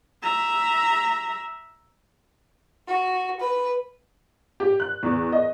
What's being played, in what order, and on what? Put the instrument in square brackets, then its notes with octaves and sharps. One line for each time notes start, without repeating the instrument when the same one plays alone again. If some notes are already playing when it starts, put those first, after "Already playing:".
[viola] E5 A#5
[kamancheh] F#4
B4
[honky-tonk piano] G4
F#6
E2
D#5